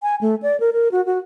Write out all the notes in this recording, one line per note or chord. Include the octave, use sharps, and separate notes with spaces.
G#5
A3
D5
A#4
A#4
F#4
F#4